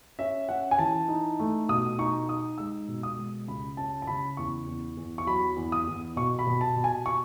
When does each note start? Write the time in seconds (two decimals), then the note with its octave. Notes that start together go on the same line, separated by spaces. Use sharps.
0.19 C#4 E5
0.49 C#4 F#5
0.71 G#5
0.78 E3 A5
1.08 D#4
1.39 A3
1.69 B2 D#6
1.99 D#4 C#6
2.28 D#4 D#6
2.58 G#3 E6
2.88 B2
3.03 D#6
3.17 G#3
3.48 C#2 B5
3.77 C#4 A5
4.02 A5
4.07 C#3 B5
4.37 E2 C#6
4.67 E2
4.97 E2
5.18 C#6
5.26 F#3 B5
5.56 E2
5.72 D#6
5.87 E2
6.16 B2 C#6
6.39 B5
6.47 B2
6.61 A5
6.76 B2
6.84 G#5
7.06 C#6